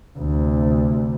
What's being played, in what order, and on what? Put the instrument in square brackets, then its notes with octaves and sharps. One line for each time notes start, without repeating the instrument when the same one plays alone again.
[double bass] D2 C3